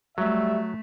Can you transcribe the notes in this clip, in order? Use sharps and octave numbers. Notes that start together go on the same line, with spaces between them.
F#3 G3 A3 E5